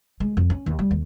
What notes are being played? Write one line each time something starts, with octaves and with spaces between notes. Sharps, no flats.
G#3
F2
C#4
D#2
G3
D#2